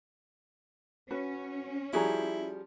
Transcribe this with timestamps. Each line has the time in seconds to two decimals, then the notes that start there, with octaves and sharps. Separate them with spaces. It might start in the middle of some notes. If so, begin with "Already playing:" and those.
1.11 C#4 F#4 B4
1.93 F3 G3 E4 F#4 G#4 A#5